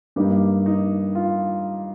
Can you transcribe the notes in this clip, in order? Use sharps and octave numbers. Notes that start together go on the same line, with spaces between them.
G2 G3 A#3 D#4 G4
D#4
F4